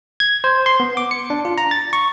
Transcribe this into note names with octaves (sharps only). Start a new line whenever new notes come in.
G#6
C5
C6
B3
D6
C#7
D4
F4
A#5
A6
C#6